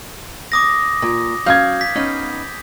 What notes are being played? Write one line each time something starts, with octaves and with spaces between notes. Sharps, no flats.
D6 D#6 A#6
A#2
F#3 C#4 F5 G6 G#6
B6
B3 C#4 D#4